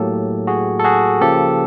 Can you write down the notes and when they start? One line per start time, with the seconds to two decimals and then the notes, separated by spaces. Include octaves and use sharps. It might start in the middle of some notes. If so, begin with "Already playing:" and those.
Already playing: A2 F#3 A#3 G4 A4
0.47 F#4 G#4
0.80 A4
0.84 F#4 G#4
1.21 C#3 F3 A#3 G4 A4